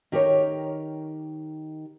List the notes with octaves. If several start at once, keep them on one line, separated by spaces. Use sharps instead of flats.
D#3 G4 A#4 C#5